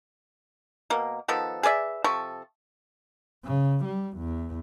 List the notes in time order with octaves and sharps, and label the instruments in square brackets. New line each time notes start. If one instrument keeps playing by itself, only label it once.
[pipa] B2 A#3
D#3 F3 B3 A4
G#4 B4 D5 E5
C3 F3 A4 C#6
[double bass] C#3
G3
E2